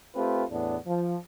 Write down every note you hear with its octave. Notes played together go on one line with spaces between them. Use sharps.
A3 C4 F4 G4 B4
E2 A2 B3 D4
F3